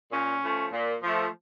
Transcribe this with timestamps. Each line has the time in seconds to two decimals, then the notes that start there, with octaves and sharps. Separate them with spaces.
0.11 A#2 C#4
0.42 F3 A3
0.72 A#2
1.03 F3 A3